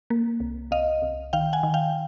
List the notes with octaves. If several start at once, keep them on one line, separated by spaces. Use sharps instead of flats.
A#3
C2
C2 D#5 F5
C2
D#3 F5 G5
F#5 G#5
D#3
F5 G5